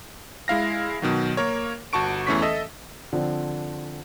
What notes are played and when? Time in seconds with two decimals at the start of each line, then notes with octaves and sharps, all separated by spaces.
0.48 G#3 E4 F5 A#6
1.02 B2 D#3 F#3
1.37 A#3 A#4 C#5
1.93 G1 F#4 A5 C#6 D7
2.27 E2 E3 A3 C#4 C#6 B6
2.42 A4 D#5 E5
3.13 D3 F3 C4